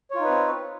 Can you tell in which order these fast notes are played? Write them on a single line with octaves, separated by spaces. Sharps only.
C#5 F4 D#4 B4 C4